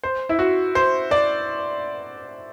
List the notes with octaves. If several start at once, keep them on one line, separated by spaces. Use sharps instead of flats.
C5
E4
F#4
C5
D5